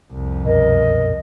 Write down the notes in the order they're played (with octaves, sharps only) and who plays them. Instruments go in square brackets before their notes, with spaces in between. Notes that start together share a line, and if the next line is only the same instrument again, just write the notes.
[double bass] C2 F2
[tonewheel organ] F#2 B2 [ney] A#4 [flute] D#5